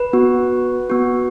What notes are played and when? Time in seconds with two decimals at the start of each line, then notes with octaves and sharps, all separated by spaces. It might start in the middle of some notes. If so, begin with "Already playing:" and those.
Already playing: B4
0.13 B3 F#4
0.90 B3 F#4